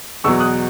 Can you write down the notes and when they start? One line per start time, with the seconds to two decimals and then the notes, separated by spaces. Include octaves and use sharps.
0.24 E2 B2 F#3 C#6 E6
0.40 D#6 F#6